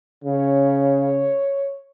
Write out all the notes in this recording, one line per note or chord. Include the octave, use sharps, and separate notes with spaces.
C#3 C#5